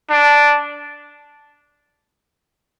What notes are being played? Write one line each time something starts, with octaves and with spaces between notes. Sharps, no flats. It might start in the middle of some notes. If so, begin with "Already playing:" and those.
D4